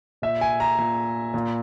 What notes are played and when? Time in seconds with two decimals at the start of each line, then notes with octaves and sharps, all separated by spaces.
0.22 A#2 E5
0.41 G#5
0.60 A#5
0.78 A#2
1.34 A#2